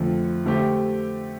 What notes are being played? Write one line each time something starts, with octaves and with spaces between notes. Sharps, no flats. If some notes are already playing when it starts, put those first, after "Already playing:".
Already playing: F2 D3 F3 A3
D3 A3 C4 G4